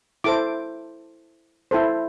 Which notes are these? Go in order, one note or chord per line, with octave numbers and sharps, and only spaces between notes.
E4 A4 C5 D6
E4 A4 C5